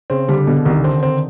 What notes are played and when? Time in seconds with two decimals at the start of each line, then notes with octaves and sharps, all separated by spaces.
0.10 C#3 C4
0.28 D3 G3
0.47 B2 D3
0.65 C2 D#3
0.84 D3 C4
1.03 C4